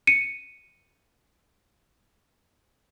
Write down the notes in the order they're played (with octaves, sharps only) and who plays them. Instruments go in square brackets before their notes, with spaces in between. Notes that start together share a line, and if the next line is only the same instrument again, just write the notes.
[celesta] C#7 D#7